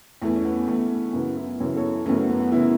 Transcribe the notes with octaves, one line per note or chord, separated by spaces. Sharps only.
E2 E3 A3
C#4
B3
E2 E3 A3
F#2 C#3 E3 B3
B3 E4
F#2 C#3 E3 C#5
A4 C#5
F#2 C#3 E3 A3 C#4
B3
B3
B3
C#3 E3 B3 E4